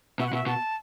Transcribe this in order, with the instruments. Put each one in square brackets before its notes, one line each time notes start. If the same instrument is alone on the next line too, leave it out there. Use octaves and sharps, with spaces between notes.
[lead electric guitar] B2 [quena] E5
[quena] F#5
[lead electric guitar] B2 [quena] E5
[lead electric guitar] B2 [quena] A5